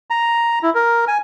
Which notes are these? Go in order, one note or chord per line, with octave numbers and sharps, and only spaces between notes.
A#5
E4
A#4
G#5